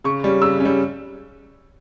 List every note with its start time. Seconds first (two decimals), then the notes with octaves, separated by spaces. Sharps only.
0.04 C#3 C#6
0.24 G3 C#4
0.42 C#3 E6
0.60 C#4
0.65 G3